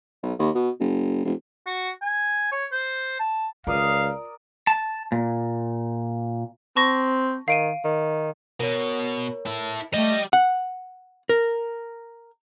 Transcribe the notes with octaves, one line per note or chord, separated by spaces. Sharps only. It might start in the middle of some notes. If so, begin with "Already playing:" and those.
B1
D#2
B2
F#1
F1
F#4
G#5
C#5
C5
A5
C#2 F4 A#4 D5 F5 D#6
A5
A#2
C4 A5 C#6 A#6
D#3 F5 D7 D#7
D#3
B2 A#4 C#5
E4 A4
G3 A3 G4 D#5
F#5
A#4